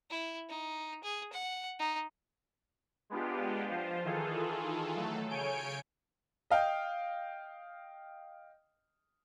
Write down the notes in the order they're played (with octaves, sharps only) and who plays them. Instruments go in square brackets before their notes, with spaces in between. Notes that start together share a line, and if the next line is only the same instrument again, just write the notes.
[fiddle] E4
D#4
G#4
F#5
D#4
[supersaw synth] G#3 B3 D4 F4 G4
F3 F4 C5
D#3 E3 F4 G#4 A4
F#3 A3 A4
C#3 C#5 G#5 G6 D7
[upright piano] D#5 F5 G5